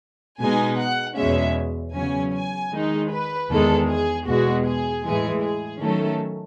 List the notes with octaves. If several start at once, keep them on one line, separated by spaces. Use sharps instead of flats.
B2 G#3 D#4 G#5
F#5
E2 B2 G#3 C#4 E5
E2 C#3 F#3 C#4 G#5
G#5
D#3 G#3 D#4
B4
E2 D#3 G#3 A4
G#4
E2 B2 G#3 F#4
G#4
A2 E3 G#3 G#4
G#4
D#3 F#3 A3 C#4 A4